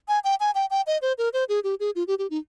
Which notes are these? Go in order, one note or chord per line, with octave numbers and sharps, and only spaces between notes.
G#5
G5
G#5
G5
G5
D#5
C5
A#4
C5
G#4
G4
G#4
F4
G4
G4
D#4